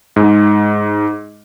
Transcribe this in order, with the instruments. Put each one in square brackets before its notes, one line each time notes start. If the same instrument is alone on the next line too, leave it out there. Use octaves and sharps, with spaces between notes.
[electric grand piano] G#2